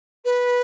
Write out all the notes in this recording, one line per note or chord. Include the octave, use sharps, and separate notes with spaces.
B4